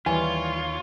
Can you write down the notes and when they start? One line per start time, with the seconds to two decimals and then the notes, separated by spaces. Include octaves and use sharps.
0.06 D#2 E3 G3 F4 C#5 G#5